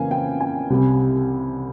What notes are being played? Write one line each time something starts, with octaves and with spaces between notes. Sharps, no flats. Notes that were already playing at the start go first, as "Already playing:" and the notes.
Already playing: F2 C#3 E3 A#3 F5 G#5
G5
G#5
C2 C3 G3